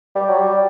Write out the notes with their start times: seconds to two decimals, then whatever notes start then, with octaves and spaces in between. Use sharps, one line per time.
0.15 G3
0.29 F#3
0.38 G3